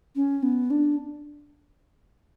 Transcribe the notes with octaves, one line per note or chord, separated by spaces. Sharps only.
C#4
B3
D4